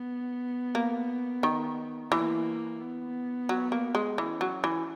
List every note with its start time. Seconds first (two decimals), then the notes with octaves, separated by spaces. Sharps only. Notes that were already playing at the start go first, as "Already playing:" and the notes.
Already playing: B3
0.75 A#3
1.43 D#3
2.12 E3 A#3
2.80 B3
3.49 F#3
3.72 A#3
3.95 G#3
4.18 E3 C#4
4.41 F#3
4.64 E3